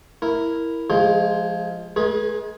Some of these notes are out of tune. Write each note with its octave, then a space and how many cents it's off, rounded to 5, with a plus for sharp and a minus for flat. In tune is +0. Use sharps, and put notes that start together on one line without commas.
E4 +0 A#4 -5
F3 -5 G#3 +15 G#4 -45
G#3 +45 G#4 +0 B4 -40